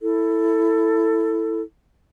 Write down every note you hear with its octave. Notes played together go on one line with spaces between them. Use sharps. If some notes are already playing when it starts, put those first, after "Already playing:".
E4 A4